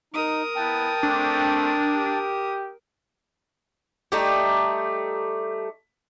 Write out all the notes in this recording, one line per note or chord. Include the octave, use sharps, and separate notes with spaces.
D#4 A#4 D#6
B3 E4 B4 G5 A5
A3 C4 D4
G4
G3 A3 D#4 G4